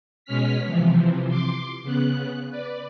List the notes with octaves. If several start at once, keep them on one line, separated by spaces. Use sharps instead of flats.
B2 G#3 C#4 F6 B6
C3 E3 F3
C6 D6
C#3 B3 F#6
B4 D5